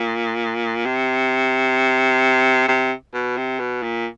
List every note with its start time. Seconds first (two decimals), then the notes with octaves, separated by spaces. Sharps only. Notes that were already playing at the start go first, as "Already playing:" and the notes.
Already playing: A#2
0.85 C3
2.68 C3
3.14 B2
3.37 C3
3.60 B2
3.82 A#2